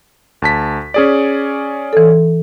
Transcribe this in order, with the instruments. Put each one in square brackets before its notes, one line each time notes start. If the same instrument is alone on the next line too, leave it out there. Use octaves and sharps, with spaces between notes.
[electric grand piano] D2 A5 B6
C#4 G#4 D5
[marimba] E3 A4